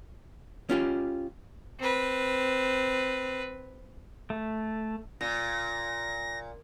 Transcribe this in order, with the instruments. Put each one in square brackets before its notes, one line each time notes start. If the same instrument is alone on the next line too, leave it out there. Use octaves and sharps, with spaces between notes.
[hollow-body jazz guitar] C#4 F4 G4
[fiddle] C4 B4
[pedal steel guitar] A3
[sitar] A#2 [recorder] A#6